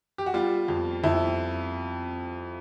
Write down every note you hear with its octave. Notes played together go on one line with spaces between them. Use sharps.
G4
F#4
G3 F4
F2
F2 E4